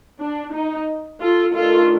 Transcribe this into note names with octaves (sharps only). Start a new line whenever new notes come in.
D4
D#4
F4 A4
D#3 A3 D4 F4 A4